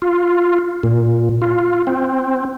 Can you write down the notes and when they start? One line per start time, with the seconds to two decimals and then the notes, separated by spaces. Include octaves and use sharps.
0.02 F4
0.83 A#2
1.42 F4
1.87 C4